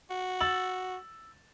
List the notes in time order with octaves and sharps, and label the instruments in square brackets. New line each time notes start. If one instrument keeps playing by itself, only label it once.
[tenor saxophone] F#4
[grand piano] E6 A6 F#7